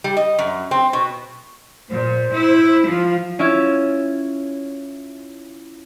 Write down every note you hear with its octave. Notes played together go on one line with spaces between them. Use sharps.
G3
D#5
F#2
C4
B2
A#2 C5
E4
F3 F4
C#4 E4 F4 E5